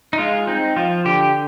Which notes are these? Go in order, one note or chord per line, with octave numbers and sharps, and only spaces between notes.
D#4
G#3 F4
C4 D#4
F3 F4
D3 G4